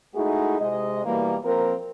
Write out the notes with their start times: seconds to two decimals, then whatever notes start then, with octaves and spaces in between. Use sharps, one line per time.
0.15 G#3 A3 D#4 E4 F#4 G#4
0.60 C3 G#3 D#5
1.05 B2 E3 G3 A#3
1.44 F3 A#3 C4 A#4